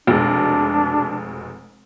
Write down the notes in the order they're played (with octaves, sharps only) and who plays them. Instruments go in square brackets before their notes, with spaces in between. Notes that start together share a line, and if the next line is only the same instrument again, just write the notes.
[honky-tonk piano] F1 B2 G#3 [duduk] D4